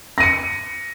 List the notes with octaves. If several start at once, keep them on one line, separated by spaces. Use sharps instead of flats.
A#6 C#7 D#7